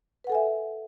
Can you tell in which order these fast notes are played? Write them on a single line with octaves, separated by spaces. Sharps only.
B4 F#5 A4 G#5 E5